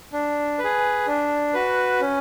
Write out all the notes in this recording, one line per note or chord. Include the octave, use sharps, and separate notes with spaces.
D4
B4
G#4
D4
F#4 B4
C#4